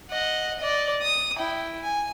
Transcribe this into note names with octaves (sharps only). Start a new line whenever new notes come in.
D#5 F#5
D5 D#5
D#6
E4 G5
G#5